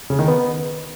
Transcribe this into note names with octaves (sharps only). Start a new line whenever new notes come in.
C#3
D#3
B3